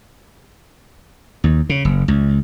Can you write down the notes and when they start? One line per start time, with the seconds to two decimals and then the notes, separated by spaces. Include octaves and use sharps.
1.44 D#2
1.69 C#3
1.85 F#1
2.08 C#2